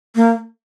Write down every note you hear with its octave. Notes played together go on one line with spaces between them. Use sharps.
A#3